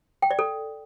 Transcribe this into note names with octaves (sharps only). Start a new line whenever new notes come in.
G5
D5
A4